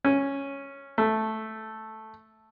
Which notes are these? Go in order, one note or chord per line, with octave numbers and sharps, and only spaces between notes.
C#4
A3